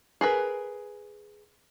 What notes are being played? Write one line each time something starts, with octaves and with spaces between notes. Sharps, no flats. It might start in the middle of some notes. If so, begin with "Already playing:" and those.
G#4 A#4 B4